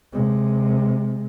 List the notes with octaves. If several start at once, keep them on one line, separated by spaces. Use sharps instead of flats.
C3 G#3